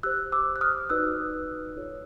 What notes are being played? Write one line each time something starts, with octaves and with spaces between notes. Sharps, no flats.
G4 C5 E6 F#6
D6 E6
F#6
D#6 F6
D#4 F#4 B4 D5 E6 F#6
F4 A4 C#5